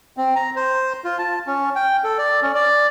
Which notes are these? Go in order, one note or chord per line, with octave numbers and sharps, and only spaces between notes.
C4
A#5
C5
F4
A5
C#4
G5
A4
D5
C#4
D5